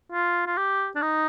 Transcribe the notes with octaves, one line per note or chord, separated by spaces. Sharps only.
F4
F4
G4
D4
D#4